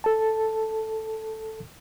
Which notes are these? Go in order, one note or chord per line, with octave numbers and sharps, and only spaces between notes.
A4 A5